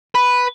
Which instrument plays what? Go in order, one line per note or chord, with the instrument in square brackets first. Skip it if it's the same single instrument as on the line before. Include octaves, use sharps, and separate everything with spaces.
[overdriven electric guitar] B4